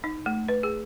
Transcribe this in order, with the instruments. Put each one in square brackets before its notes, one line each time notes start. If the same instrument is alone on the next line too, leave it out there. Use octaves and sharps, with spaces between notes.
[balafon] D#4
A3
B4
G#4